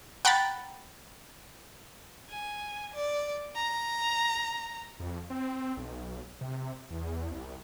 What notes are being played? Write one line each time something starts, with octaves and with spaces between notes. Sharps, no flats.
F#5 G5 A#5 B5 A6
G#5
D5
A#5
F2
C4
B1
C3
E2
C2